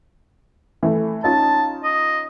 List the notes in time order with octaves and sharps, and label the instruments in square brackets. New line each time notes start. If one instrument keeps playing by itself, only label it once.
[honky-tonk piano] E3 A3
[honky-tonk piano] C#4 D#4 F4 [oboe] A5
[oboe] D#5